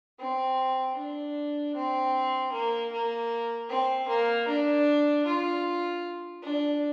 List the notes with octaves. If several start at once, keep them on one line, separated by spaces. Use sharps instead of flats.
C4
D4
C4
A#3
A#3
C4
A#3
D4
F4
D4